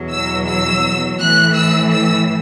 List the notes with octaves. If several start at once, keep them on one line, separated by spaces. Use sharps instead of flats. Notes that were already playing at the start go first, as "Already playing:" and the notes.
Already playing: E2 B2 F#3
E6
E6
A2 E3 F#6
E6
E6